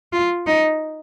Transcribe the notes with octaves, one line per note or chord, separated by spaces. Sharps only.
F4
D#4